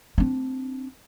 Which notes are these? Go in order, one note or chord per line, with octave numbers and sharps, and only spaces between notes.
C4 D4